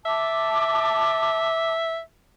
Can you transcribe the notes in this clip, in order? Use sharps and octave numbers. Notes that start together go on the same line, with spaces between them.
E5 A5 D6